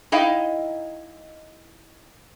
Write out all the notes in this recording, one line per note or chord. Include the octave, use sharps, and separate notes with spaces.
D#4 E4 D#5 F5 G5